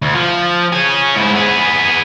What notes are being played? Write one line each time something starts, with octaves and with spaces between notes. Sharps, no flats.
D2
F3
C#4 G#4
G#2 E4
B3 G#4